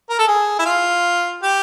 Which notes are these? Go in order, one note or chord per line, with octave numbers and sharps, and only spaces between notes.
A#4
A4
G#4
E4
F4
G4